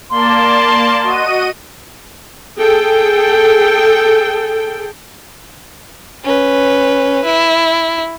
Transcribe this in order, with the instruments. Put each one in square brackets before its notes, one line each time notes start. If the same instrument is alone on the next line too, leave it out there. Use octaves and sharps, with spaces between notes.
[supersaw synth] A#3 D5 A5 [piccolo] C6
[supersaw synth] F#4 D#5 D#7
[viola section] G#4 A4 G5
[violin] C#4 B4
E4